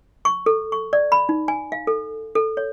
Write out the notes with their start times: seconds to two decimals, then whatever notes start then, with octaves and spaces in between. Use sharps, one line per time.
0.25 C#6
0.46 A4
0.72 C#6
0.93 D5
1.12 B5
1.29 D#4
1.48 G#5
1.72 F5
1.87 A4
2.35 A4
2.57 C#5